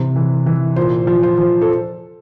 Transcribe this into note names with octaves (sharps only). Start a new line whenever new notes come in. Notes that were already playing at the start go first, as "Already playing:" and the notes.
Already playing: C3 E3
E3
E3
A#2 C5
F3
C5
F3
A4